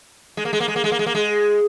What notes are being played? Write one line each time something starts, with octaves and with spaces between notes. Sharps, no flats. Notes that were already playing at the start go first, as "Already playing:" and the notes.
G#3
A#3
G#3
A#3
G#3
A#3
G#3
A#3
G#3
A#3
G#3